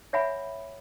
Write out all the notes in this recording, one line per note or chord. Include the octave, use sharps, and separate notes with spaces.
C#5 E5 F#5 G#5 B5